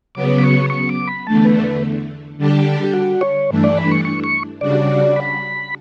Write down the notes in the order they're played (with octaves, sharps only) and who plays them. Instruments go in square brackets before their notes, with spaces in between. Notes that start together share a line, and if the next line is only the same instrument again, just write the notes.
[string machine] C#3 F#3 B3 [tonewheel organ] D6
[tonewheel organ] B5
C#6
C#6
D6
B5
[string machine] E2 D3 A3 [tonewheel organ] A5
[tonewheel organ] B4
B4
[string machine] D3 G3 D4 G4
[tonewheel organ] G4
F#4
C#5
[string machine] G2 E3 A3 D4
[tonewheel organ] D5
B5
C#6
C#6
C#6
[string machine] C#3 G3 D4 F#4 [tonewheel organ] D5
[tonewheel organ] B5